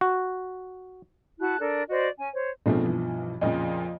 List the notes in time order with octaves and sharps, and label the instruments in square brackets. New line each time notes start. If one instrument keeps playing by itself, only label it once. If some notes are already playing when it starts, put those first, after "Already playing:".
[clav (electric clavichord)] F#4
[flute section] E4 F#4 A5 F#6
D4 A4 A#4
F#4 C5 D5 D#5
C#4 G#5
C5 C#5
[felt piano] B1 G2 F3 [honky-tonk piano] G#3 A3 C4
[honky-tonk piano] E3
[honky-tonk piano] F2 A#2 C#3 [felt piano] F3 D#5